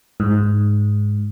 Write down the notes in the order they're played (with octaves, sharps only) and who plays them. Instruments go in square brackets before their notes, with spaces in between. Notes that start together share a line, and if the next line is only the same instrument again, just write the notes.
[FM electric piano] G#2